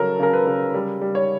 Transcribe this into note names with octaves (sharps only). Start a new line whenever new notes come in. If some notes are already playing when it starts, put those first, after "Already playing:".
Already playing: C#3 F#3 A4 A#4
C#3 A#4
B4
C#3
G3
G3
C#5